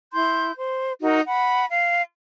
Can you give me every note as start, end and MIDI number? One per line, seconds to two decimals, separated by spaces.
0.13 0.52 64
0.13 0.52 84
0.13 0.52 91
0.56 0.93 72
1.01 1.20 63
1.01 1.20 66
1.01 1.20 70
1.26 1.65 78
1.26 1.65 83
1.69 2.02 77